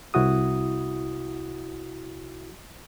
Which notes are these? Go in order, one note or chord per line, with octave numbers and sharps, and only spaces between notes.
C2 E4 F#4 D#6